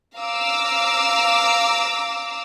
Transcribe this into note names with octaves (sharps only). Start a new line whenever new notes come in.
F5 A#5 D6 E6